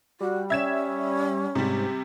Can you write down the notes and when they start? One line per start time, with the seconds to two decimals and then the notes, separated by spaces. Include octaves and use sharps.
0.21 G3 F#4
0.50 C#4 E5 G#6 E7
1.55 G#2 C3 G3